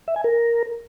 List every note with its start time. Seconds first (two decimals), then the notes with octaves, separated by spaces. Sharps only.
0.08 E5
0.16 G#5
0.24 A#4